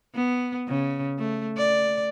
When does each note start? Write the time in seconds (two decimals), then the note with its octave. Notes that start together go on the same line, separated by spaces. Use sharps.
0.15 B3
0.68 C#3
1.19 A3
1.58 D5